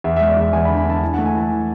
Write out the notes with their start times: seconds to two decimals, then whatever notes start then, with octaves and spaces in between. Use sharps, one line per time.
0.04 E2 E5
0.16 G#3 E5
0.28 D5
0.37 E2 E5
0.53 E2 G#5
0.65 B5
0.69 D3
0.77 B5
0.85 D3 A5
1.02 E3 G#5
1.14 A3 F#5
1.26 G#5
1.34 E3 A5
1.50 E3